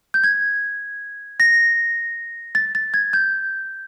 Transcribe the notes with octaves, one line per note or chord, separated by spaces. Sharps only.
G6
G#6
A#6
A6
A6
G#6
G6